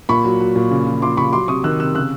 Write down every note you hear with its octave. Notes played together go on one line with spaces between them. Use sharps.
A#2 B5 C#6
F#3
F#3
A#2
C#3
F3
F3 C6 D6
C#3 B5 C#6
F#3 C6 D6
C3 C#6 D#6
D#3 E6 F#6
C3 E6 F#6
C#3 E6 F#6